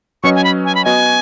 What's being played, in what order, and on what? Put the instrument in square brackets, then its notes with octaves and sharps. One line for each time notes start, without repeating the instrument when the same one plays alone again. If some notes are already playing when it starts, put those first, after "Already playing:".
[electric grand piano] F#3 C#4 B4 D#5 [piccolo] C#6
[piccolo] G#5
B5
G#5
B5
[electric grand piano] B3 F#4 D#5 [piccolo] G#5